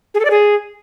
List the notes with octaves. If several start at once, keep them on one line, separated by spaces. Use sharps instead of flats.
G#4
A4
D5
G#4